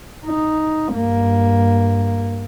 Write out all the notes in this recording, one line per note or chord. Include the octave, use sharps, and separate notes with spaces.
D#4
G2 A#3